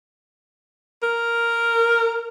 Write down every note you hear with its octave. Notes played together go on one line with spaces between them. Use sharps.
A#4